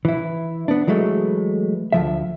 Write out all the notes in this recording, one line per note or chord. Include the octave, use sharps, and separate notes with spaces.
E3 E4
B3 D4
E3 F#3 G#3 A3
D2 F3 E5